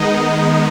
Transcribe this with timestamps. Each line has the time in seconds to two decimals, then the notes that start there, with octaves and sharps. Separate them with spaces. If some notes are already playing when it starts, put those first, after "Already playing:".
Already playing: D#3 G#3 B3 D#4 D#5
0.28 D#5